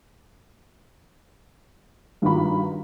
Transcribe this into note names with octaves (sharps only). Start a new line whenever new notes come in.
G2 D#3 F4 F#4 A#5 B5